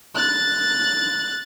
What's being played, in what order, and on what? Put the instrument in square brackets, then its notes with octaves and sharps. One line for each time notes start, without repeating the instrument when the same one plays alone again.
[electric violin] F#6 A6